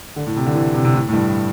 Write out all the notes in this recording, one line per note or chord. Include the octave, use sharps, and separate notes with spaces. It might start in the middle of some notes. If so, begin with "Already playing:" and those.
D3
A2
C3
D3
E3
C3
C3
A2
A2
G2